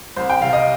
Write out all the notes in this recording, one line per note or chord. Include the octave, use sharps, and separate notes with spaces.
C2 C5
G5
C3 G3 C4 F5
D#5